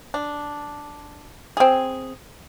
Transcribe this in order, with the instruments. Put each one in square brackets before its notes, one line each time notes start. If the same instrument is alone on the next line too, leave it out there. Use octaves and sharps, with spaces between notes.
[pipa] D4
C4 G#4